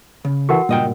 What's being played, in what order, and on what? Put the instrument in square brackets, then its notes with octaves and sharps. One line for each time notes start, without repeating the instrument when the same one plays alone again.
[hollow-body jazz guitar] C#3
[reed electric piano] E3 A4 C#6 [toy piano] F#4 A#4 F#5
[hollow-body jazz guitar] C#2 D#5 G5 [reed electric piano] G2 A#2